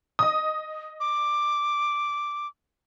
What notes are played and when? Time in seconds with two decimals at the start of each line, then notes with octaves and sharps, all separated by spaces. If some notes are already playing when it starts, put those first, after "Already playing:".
0.19 D#5 D#6
1.00 D6